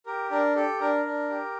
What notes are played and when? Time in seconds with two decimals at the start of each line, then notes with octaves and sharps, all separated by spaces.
0.06 G4 A#4
0.31 D4 A#4
0.55 G4 A4
0.80 D4 A#4
1.05 D4
1.29 G4